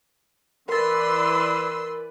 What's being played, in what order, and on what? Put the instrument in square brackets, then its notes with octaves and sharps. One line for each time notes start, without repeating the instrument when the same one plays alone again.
[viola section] E3 B4 D5 [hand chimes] A#4 A6 [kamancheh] C6 E6